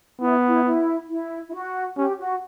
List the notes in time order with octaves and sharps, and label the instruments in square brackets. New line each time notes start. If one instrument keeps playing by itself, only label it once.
[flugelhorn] B3 [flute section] E4
[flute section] E4
E4
E4
E4
F#4
[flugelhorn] C#4 [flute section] G4
[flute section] F#4